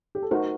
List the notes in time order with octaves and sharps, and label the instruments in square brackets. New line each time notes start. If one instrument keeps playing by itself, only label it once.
[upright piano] G4
A4
[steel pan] A3 D#4 F#4 C5 [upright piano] A#4